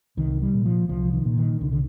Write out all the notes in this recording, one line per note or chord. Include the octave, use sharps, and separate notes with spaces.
C2 D#3
G3
A#2
F3
C2 F3
D#3
A#2
D#3
C2 D3
D3